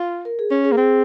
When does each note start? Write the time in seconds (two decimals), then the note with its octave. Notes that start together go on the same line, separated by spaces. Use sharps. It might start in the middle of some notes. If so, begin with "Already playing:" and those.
Already playing: F4
0.25 A#4
0.39 G#4
0.51 C#4
0.65 G#4
0.72 A#3
0.77 C4 G#4